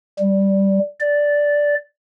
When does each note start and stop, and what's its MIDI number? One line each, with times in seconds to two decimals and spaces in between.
0.19 0.79 55
1.00 1.74 74